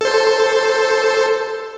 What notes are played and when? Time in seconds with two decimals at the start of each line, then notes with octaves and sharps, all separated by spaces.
0.01 A4 C5